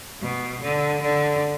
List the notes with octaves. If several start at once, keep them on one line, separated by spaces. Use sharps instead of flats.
B2
D3
D3